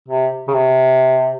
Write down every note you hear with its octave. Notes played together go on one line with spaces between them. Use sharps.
C3
C#3
C3